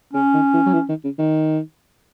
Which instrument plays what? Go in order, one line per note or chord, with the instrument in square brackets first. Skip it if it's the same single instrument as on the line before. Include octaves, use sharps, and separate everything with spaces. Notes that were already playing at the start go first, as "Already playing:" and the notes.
[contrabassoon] C#3 [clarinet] C#4
[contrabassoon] D#3
E3
F#3
E3
D#3
C#3
D#3